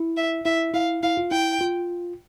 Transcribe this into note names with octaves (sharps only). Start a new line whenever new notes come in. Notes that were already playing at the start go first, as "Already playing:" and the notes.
Already playing: E4
E5
E4 E5
E4 F5
E4 F5
F4
E4 G5
F4